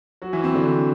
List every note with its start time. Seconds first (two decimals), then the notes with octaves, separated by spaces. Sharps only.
0.22 F#3 F#4
0.33 E3 E4
0.44 C4
0.54 D3 D4